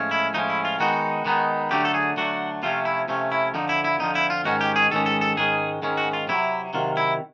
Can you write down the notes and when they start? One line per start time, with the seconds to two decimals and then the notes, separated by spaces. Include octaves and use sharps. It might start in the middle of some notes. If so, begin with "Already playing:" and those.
Already playing: A2 F3 G#3 C#4
0.11 E4
0.34 A2 F3 G#3 C#4 D#4
0.50 E4
0.65 F4
0.79 D#3 G#3 B3 D#4 F#4
1.25 D#3 G#3 B3 D#4
1.71 D3 F#3 A3 D4 G4
1.85 A4
1.94 G#4
2.17 D3 F#3 A3 D4 F#4
2.63 C3 F3 A3 C#4 F4
2.85 E4
3.08 C3 F3 A3 C#4
3.32 E4
3.54 F2 D3 F3 D#4
3.69 E4
3.84 E4
4.00 F2 D3 F3 D#4
4.15 E4
4.30 F4
4.45 G#2 D#3 G#3 C#4 F#4
4.61 G4
4.76 G#4
4.91 G#2 D#3 G#3 C#4 A4
5.06 A4
5.21 A4
5.37 G#2 D#3 G#3 C#4 G#4
5.83 G#2 D#3 G#3 C#4
5.97 F#4
6.13 F4
6.28 C3 D#3 F#3 E4
6.73 C3 D#3 F#3 F4
6.97 E4